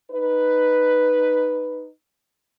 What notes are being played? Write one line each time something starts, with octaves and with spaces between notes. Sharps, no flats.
D#4 B4